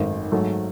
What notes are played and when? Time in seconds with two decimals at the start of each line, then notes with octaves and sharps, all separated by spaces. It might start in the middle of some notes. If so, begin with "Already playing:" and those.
Already playing: G#1 F#2 D#3 A3
0.32 G#2 F#3 A3